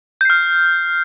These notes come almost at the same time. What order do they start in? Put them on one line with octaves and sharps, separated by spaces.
G6 C7 F6